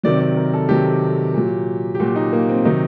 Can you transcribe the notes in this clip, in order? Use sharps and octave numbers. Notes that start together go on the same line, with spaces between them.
C3 D#3 F#3 D5
D5
A#4
A4
C3 D#3 F#3 G4
A#2 F#3
G4
A#2 F#3 F#4
D#4
A#3
C4
C3 D#3 F#3 D#4